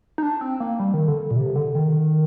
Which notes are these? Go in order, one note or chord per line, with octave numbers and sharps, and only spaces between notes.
D#4
D4
C4
A#3
G3
D#3
D3
A#2
C3
D3
D#3